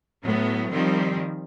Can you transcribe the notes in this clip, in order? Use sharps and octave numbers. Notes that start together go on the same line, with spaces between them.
A2 F#3 B3
D#3 F3 G3 C4